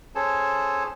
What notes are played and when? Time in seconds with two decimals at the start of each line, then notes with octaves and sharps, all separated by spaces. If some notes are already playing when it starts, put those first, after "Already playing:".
0.15 C#4 G#4 A4 C5 C#5 A5